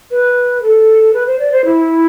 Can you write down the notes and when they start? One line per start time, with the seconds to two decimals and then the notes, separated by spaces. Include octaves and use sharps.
0.11 B4
0.62 A4
1.13 B4
1.26 C5
1.39 D5
1.52 C5
1.65 E4